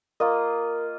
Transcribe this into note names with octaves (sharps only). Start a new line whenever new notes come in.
A#3 F4 A#4 D#5